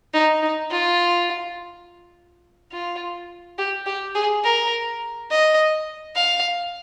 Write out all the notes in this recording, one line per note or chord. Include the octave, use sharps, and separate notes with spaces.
D#4
D#4
F4
F4
G4
G4
G#4
A#4
D#5
F5